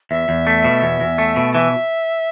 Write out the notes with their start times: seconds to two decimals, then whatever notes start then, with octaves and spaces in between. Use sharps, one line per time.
0.11 E2 E5
0.29 E2
0.47 A3
0.64 B2
0.83 E2
1.00 E2
1.18 A3
1.36 B2
1.54 E3 E5